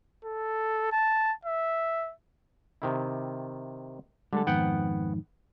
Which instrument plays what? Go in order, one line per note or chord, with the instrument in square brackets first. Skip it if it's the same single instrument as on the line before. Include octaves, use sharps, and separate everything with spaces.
[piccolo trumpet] A4
A5
E5
[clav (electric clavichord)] C3 D#3 E4
[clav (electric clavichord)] D3 [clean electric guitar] G3 G#3 A4
[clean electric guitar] F2 G#2 D#3 [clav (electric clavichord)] B3 F#5 G5